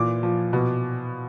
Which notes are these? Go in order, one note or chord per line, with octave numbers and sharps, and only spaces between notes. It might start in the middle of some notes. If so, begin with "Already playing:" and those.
Already playing: A#2 E3 D6
F3
B2